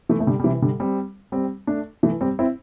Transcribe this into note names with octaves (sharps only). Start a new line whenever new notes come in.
E3 A3
A3
D3 G3
G3
C3 E3
D3 G3
G3 C4
G3 C4
A3 D4
E3 A3
G3 C4
C4 E4